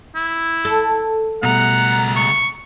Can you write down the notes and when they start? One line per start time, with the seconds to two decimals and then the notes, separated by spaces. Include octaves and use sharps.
0.16 E4
0.65 A4
1.43 C#2 B2 G3 A3 F#5 A#5
2.17 C#6